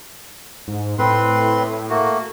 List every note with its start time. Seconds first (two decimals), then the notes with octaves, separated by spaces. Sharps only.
0.68 G#2
0.99 A2 C4 B4 C6
1.89 A3 A#3 F#4